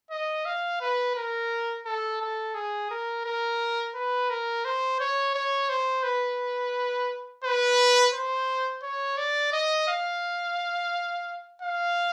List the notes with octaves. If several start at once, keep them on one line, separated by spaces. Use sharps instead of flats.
D#5
F5
B4
A#4
A4
A4
G#4
A#4
A#4
B4
A#4
C5
C#5
C#5
C5
B4
B4
C5
C#5
D5
D#5
F5
F5